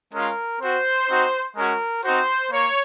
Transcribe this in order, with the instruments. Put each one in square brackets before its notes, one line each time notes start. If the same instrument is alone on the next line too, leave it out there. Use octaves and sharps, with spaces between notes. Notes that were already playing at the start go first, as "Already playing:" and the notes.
[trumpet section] G#3 C#4 F4 A#4
C4 F#4 C5
C4 D#4 F#4
G#3 C#4 F#4 A#4
C4 D#4 F#4 C5
A#3 C#5